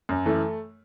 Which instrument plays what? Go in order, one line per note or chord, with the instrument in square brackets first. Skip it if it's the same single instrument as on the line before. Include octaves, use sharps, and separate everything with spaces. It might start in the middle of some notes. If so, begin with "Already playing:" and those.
[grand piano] F#2
E3 A3